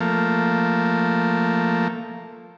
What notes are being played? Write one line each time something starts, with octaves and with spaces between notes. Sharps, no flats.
F3 A3 A#3